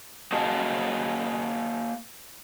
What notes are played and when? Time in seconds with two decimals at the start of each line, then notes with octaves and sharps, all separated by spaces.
0.32 A#3 F#4 G#4 D#5 A5